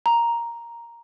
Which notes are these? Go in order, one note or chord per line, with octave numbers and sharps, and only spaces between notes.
A#5